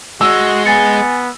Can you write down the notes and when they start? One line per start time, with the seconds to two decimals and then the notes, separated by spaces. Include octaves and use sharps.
0.21 G#3 F#4 E6
0.66 B3 G#5 A6 C#7